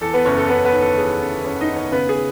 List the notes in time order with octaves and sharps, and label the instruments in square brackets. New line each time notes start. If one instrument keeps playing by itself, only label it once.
[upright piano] E2 A4
B3 B4
F#1 C#4 C#5
A4
F#1 B3 B4
B3 B4
D#3
A4
E2 G#4
F#1 A4
F#1 C#4 C#5
D#4 D#5
D#3
C#4 C#5
C#3 B3 B4
G#4